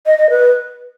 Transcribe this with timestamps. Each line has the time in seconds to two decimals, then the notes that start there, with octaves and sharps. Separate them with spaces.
0.06 D#5
0.18 D#5
0.30 B4